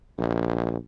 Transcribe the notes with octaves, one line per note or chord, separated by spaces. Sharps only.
A#1